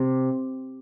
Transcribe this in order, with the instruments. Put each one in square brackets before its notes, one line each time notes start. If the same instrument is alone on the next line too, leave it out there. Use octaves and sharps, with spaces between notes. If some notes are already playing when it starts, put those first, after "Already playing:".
Already playing: [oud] C3